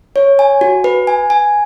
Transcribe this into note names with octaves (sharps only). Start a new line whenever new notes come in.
C#5
G#5
F#4
B4
G#5
G#5